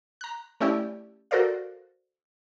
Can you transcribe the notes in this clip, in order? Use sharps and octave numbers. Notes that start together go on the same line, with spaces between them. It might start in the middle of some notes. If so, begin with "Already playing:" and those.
A#5 F#6
A3 C#4 E4 G4 D5
F#4 A4 A#4 C5 D5 F5